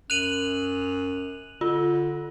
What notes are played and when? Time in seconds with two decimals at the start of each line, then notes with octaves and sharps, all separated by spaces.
0.10 F#2 F#6 D#7 F7 F#7
1.61 D3 F4